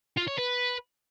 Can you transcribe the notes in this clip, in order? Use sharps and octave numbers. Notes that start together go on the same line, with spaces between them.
F4
C#5
B4